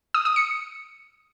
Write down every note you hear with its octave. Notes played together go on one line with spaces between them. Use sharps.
D#6
D#6
C#7